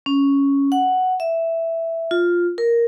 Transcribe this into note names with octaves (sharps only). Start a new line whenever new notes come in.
C#4
F#5
E5
F4
A#4